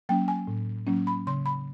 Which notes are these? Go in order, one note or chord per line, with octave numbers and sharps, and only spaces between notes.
F#3 A#3 C#4 G5
G#5
A2
F#3 A#3 C#4
B5
C#3 C6
B5